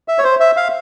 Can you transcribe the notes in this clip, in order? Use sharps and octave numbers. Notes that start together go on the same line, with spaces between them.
E5
C#5
C5
E5
F5